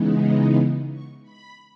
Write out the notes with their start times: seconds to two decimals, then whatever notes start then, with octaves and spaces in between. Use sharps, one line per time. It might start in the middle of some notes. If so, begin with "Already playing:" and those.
Already playing: C#3 E3 G#3 B3 D#4
0.92 C#6
1.23 B5